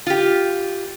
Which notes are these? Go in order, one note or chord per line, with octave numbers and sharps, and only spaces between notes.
F4 G4